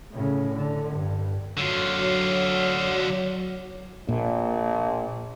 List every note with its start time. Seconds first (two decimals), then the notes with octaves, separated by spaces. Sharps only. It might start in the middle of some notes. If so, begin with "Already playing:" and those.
0.12 A2 C#3
0.55 D3
0.90 G2
1.57 D3 F#3 F4
4.09 A#1 A#2